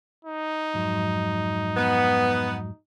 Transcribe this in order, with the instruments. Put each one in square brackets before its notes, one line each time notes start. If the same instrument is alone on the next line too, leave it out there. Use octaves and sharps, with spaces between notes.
[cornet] D#4
[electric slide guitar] F2 G#2 F#3
[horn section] B3